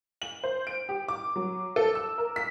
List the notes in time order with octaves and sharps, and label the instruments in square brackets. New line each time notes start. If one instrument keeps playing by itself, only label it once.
[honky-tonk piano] F#7
C5
D7
G4
D6
F#3
A4
E6
A#4
B6